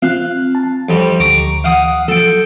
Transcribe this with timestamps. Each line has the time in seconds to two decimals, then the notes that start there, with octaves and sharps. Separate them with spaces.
0.02 C4 F4 F5 F#6
0.55 A5
0.89 F2 G3
1.20 D2 A#5 C#6 D6
1.64 F5 F#5 D#6
2.08 F3 F#3 A4 G5